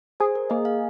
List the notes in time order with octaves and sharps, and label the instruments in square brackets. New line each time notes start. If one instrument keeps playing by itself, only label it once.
[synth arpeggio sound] G#4 [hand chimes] C5
[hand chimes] A#4
[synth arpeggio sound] A#3 [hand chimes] D#5
[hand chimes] F5